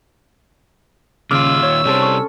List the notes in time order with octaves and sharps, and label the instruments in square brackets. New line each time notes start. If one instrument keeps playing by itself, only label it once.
[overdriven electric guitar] D#2 F4 [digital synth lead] C#3 [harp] D6 F6 [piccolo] E6
[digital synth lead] C#5
[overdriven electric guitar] C3 G3 [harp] C#4 A4 C5
[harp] C#6